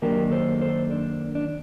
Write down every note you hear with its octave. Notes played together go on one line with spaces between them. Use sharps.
F#2 D#3 F#3 A#3 D4 G4 A#4
A4 C5
A4 C5
D4
D4